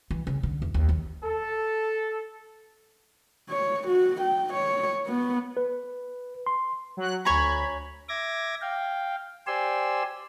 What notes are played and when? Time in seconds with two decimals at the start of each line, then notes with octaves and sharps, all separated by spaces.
0.11 E3
0.27 C#3
0.43 D3
0.62 E2
0.74 D#2
0.89 D#3
1.24 A4
3.49 C#5
3.88 F#4
4.21 G5
4.53 C#5
5.07 B3
5.57 B4
6.47 C6
6.97 F#3 F#6
7.25 D2 C#5 G#5 A#5 B5
8.09 E5 D6 G#6 A#6
8.62 F5 G5
9.47 G4 C5 D5 G#5 C6 E6